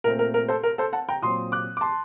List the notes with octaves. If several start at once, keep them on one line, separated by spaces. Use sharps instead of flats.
A#2 A3 C4 A#4
A#4
A#4
A4 C5
A#4
A4 C5
F#5 A5
G5 A#5
A#2 F#3 C4 C6 D#6
D6 F#6
D6
A5 C6